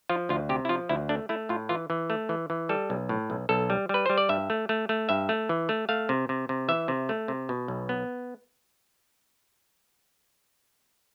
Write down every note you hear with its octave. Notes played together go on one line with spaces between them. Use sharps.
F3 F4
D2 F4
C3 G4
E4
F3 F4
D2 E4
A3 D4
A3 E4
A2 F4
E3 F4
E3
A3
E3
E3
G3 A4
B1
A2
B1
B1 A4
G3
G3 B4
G3 C5
D5
G2 E5
A3
A3
A3
G2 E5
A3
E3
A3
A3 F5
C3
C3
C3
E3 E5
C3
A3
C3
B2
B1
B3